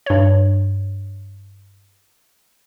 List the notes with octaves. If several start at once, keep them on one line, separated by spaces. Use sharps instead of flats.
G2 C#5